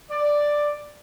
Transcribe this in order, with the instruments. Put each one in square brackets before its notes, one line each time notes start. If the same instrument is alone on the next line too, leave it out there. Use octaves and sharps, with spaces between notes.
[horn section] D5